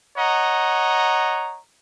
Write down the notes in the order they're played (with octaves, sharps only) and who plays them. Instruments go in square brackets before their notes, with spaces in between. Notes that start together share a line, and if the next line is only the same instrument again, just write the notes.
[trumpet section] C#5 D#5 F#5 A#5